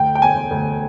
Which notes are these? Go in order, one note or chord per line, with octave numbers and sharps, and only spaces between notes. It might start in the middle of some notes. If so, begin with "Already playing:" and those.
Already playing: D2 G5
G5
E1 G#5
D2